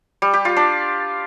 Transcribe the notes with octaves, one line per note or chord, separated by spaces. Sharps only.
G3
G4
F4
D4